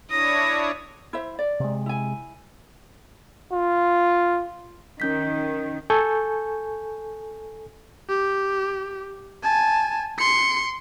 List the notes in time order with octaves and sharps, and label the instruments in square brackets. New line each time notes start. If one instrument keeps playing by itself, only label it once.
[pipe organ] D4 E4 C#5 [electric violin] D#6 [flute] A#6
[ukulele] E4 C5 E5
D5
[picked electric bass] C3 G#3
[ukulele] E4 G#5
[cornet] F4
[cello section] D#3 [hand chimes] C#4 G6 B6
[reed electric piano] A4 G#5 C#6 G6
[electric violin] G4
G#5 A5
C6 C#7